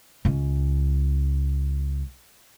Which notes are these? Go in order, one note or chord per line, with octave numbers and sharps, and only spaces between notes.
C#2 C#4